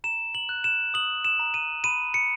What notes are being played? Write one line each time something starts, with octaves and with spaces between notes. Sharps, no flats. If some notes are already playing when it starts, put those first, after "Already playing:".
A#5 E7
F#7
F#6
E7
D#6 F#7
E7
A#5
D#7
B5 D#7
C#7